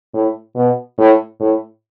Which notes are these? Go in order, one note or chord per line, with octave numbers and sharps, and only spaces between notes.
A2
B2
A2
A2